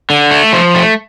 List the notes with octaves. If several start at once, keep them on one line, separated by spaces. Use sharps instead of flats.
D3
A3
F3
A3